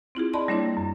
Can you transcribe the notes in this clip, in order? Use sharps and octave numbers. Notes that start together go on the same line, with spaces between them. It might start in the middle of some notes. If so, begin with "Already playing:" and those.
C4 E4 F4 G#4
D5 D#5 A5 B5 C6
G3 A#3 D4 E4 C#5
F#2